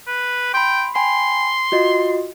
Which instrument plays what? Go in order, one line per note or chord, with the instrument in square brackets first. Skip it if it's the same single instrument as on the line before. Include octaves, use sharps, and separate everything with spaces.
[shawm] B4
[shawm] G5 [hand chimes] B5 C6
[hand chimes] G5 G#5 B5 [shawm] C6
[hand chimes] F4 F#4 D#5